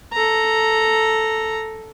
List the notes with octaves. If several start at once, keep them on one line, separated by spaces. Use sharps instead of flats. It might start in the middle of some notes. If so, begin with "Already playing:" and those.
A4 A#5